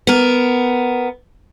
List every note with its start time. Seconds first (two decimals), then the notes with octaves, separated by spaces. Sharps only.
0.07 B3 A#4